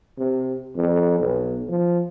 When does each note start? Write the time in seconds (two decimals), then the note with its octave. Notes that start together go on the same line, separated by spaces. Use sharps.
0.18 C3
0.76 F2
1.20 B1
1.69 F3